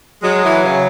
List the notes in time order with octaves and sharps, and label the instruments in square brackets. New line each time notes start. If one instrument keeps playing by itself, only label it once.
[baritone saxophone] F#3 [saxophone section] G#3
[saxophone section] E3
C#3